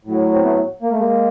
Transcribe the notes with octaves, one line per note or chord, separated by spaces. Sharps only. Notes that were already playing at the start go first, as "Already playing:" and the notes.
A2 F#3
C4
A3 B3
A#3
A3
G#3 A#3